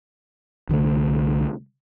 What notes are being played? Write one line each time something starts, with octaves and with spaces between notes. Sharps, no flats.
C2 D3 D#3 A3